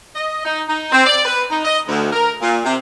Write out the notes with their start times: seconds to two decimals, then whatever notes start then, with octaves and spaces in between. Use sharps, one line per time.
0.15 D#5
0.45 D#4
0.68 D#4
0.92 C4
1.06 D5
1.25 B4
1.50 D#4
1.65 D#5
1.88 D2
2.13 A#4
2.41 A#2
2.65 C3